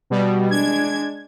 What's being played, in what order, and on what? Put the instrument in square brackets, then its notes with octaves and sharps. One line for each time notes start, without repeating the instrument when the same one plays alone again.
[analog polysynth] B2 G3
[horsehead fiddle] G#3 D4 [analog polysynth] G#6